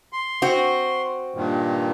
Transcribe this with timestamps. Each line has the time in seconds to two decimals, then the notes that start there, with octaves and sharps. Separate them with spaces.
0.13 C6
0.42 C4 F#4
1.35 G2 A#2 D#3